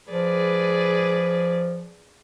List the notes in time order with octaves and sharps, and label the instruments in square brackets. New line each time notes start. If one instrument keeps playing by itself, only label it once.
[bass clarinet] F3 [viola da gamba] G#4 B4 D5